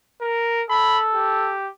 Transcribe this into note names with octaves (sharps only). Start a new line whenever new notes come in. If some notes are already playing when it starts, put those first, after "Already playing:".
A#4
A4 B5
G4